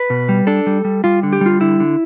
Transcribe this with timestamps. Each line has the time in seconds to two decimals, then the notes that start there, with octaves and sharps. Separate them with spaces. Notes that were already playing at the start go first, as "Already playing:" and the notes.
Already playing: B4
0.10 B2
0.29 G3
0.47 D4 A4
0.67 G3
0.85 G3
1.04 G3 F4
1.23 D3
1.33 G4
1.41 G3 F4
1.60 D3 E4
1.80 D3